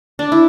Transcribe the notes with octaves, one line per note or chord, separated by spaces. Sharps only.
D4
E4